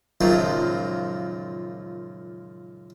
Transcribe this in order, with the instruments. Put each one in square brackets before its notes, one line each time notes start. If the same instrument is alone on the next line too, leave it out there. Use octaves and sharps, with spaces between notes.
[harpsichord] C#2 F#2 A#2 D#3 F3 F#3